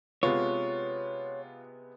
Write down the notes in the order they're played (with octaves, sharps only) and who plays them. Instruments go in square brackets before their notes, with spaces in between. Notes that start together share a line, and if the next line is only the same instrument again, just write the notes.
[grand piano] C3 G#3 B3 [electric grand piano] F4 [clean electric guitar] C#5